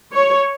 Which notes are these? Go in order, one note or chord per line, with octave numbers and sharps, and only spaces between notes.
C#5